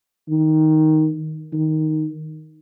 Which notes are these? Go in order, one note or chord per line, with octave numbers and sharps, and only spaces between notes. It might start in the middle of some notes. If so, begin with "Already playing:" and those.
D#3
D#3